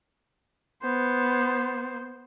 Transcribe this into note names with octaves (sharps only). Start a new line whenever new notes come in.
B3 C5